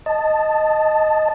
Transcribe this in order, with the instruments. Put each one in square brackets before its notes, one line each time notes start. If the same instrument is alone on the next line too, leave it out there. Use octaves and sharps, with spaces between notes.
[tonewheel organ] D#5 A5